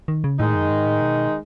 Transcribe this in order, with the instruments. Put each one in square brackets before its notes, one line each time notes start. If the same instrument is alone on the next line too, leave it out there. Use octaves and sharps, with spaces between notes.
[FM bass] D#3
C#3
[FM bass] A2 [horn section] D#3 G#3 D#4
[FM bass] F#2
G#2
A2
B2